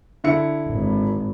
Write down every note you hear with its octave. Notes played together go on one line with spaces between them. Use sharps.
D3 E4 C#7
G#1